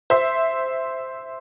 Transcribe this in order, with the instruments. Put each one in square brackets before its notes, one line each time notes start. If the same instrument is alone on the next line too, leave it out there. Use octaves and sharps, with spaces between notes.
[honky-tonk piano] C5 E5